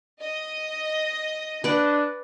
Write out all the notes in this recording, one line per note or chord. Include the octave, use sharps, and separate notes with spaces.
D#5
D4 B4 D5 F#5